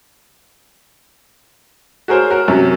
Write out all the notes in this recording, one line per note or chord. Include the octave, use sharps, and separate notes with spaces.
F#4 G#4 A#4 C5 C#5
F#4 A#4
F#2 C3